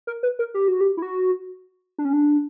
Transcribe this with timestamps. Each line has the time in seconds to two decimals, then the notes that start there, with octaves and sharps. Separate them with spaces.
0.07 A#4
0.23 B4
0.39 A#4
0.54 G4
0.68 F#4
0.81 G4
0.97 E4
1.02 F#4
1.98 D4
2.05 C#4
2.13 D4